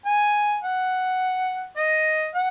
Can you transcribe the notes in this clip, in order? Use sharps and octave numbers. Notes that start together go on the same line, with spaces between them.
G#5
F#5
D#5
F#5